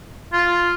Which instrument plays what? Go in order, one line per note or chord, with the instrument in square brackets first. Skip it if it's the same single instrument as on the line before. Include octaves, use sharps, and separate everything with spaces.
[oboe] F4